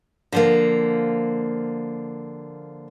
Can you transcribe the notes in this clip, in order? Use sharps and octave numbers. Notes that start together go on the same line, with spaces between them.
D3 F3 A#3